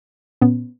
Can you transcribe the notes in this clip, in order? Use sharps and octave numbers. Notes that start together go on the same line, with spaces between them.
A#2 B3 C#4